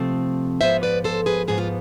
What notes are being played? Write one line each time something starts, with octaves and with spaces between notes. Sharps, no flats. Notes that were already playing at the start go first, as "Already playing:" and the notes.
Already playing: C3 F3 A3 C4
G#2 F3 B3 C5 E5
B4 D5
A4 C5
G#4 B4
G#2 F3 B3 G#4
F4